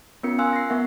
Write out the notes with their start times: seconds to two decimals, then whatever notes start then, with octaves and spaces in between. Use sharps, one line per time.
0.23 B3 C#4 F4 A#4 C#7
0.39 F5 G#5 C6 E6 F#6
0.53 A#6 C7
0.69 B3 A#4 E5 F#5